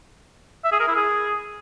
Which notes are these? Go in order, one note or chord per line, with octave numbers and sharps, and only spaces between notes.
E5
G#4
A#4
E4
G#4